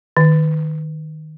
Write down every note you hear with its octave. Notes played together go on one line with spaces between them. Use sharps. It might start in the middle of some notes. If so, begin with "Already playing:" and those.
D#3